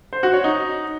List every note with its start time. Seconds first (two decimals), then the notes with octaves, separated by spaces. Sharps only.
0.13 C5
0.23 F#4
0.34 C#5
0.44 D#4